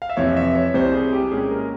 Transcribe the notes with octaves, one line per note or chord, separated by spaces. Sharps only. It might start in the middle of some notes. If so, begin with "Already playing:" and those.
F5
E5
F2 C3 E3 C#5
E5
C#5
C2 C3 G3 C5
G#4
G4
A#2 G#3 C#4 G#4
A#4